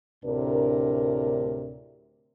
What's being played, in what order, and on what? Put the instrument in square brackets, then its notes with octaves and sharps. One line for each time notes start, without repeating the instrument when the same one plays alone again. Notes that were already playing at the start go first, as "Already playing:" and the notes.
[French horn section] D2 A2 C3 D4 A#4